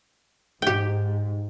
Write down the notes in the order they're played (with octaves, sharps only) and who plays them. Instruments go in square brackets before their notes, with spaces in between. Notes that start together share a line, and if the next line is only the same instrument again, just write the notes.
[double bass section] G#2 [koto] G4 G5